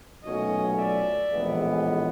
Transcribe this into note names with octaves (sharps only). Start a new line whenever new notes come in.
B1 A#2 F#3 A3 C#4 C#5 D#5
D5 E5
A#1 A2 E3 G#3 B3